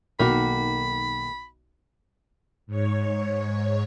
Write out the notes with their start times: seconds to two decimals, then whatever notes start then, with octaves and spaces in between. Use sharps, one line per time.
0.19 B1 D#3 A#3 F#4 B5
2.67 G#2 C#5